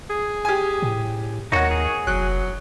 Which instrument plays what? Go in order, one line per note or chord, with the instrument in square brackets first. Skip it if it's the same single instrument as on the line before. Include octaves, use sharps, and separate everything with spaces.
[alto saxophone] G#4
[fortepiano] G4 G#5
[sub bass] A2
[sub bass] D#2 [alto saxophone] D#3 [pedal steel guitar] D#4 F#4 [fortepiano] C#5 F#5
[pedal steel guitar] G#4
[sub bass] F1 [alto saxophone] F#3 [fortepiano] F#6